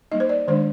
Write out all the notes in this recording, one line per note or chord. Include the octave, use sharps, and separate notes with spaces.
G3 A#3 D#4 D#5
C5
D5
D#3 G#3 D4 C5